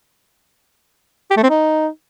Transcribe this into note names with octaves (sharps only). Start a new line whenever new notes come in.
G4
A3
C4
D#4